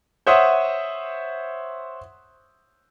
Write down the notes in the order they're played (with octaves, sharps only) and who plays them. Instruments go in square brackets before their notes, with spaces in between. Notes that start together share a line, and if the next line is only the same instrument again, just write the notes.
[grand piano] C5 C#5 E5 F#5 D#6